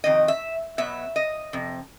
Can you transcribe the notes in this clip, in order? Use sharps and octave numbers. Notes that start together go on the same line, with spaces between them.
F2 C3 D#3 D#5
E5
B2 F#3 B3 E5
D#5
F2 C3